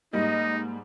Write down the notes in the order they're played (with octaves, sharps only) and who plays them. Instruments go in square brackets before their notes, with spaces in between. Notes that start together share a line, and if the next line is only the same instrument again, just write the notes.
[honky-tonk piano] G#2 G3 [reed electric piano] A#3 [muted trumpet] D#4 [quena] D#5